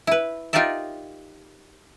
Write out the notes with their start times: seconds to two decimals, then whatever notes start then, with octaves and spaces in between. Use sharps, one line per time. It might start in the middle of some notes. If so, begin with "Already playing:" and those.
0.07 E4 B4
0.53 D#4 F4 G4 A#4 D5 E5